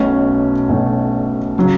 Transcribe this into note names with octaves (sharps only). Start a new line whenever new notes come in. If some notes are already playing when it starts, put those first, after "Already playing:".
Already playing: B1 B2 A3 C#4
B1 B2 A3 C#4
C#3 F#3